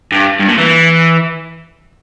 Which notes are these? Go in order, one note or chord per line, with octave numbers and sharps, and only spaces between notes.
G2
G2
A#2
E3